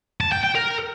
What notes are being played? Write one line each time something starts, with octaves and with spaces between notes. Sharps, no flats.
A5
G5
G5
A#4